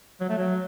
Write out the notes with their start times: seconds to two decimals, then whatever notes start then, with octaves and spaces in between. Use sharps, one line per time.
0.20 F#3
0.29 A3
0.37 F#3